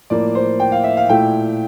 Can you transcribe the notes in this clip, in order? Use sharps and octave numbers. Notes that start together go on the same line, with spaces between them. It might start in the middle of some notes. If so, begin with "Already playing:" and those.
A2 F3 A#3 D5
C5
G5
F5
E5
F5
A#2 A3 E4 G5